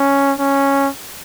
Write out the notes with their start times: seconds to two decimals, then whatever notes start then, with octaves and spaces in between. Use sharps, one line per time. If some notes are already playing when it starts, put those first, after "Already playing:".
Already playing: C#4
0.39 C#4